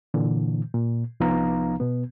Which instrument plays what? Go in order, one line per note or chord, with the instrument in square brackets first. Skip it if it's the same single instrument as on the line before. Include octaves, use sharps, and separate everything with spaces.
[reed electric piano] A#2 D3 E3
A#2
C2 F3 B3 D#4 F5 A#5
B2 B3